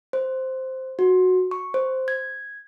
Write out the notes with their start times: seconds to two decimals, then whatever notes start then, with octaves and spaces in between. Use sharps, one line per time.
0.13 C5
0.99 F#4
1.51 C#6
1.74 C5
2.08 G#6